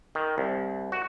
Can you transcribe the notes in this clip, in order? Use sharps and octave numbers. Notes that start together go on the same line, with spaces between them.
D#3
C2
F#4